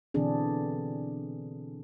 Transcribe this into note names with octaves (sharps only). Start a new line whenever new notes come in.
B2 D3 E3 C4 D4 G#4